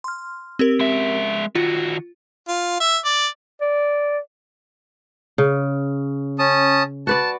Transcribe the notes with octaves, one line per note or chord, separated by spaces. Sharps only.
C6 F6
C4 G4 A#4
G#3 E5
D#3 F4 F#4
F4
E5
D5
D5
C#3
C#4 A5 D#6
F#4 B4 D5 A5